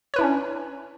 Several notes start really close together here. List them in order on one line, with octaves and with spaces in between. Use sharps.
C#5 B4 E4 D4 C#4